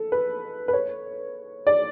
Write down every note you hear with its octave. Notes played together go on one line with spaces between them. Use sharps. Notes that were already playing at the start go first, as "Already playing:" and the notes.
Already playing: A4
B4
B4
C#5
D5